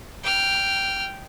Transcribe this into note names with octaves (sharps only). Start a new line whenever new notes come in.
G5 F6